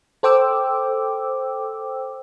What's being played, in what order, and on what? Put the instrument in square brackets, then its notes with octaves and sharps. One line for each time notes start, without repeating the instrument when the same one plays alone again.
[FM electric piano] A4 C5 G5 D6 E6